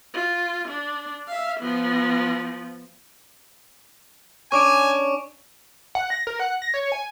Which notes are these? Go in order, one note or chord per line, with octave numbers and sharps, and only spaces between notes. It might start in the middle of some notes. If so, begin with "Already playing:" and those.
F4
D4
E5 F5
F3 B3
C#4 D4 G#5 C#6 D6 D7
F#5
A#6
A#4
F#5
A#6
C#5
G#5